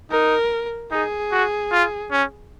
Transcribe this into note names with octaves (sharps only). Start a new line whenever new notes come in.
D#4 A#4
D#4 G#4
F#4
F4
C#4